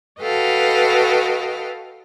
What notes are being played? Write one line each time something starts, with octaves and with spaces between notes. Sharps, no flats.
F#4 A4 B4 D#5 F5 G5